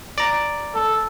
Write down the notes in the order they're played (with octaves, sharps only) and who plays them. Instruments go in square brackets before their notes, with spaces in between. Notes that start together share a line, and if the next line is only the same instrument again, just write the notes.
[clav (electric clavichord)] D5 A#5
[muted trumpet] A4